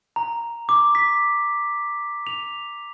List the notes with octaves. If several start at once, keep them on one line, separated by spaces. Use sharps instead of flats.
A#5
D6
B6
F7